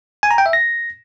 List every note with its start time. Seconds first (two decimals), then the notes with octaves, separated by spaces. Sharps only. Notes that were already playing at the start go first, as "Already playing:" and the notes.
0.23 G#5
0.31 A#5
0.38 G5
0.46 E5
0.53 A#6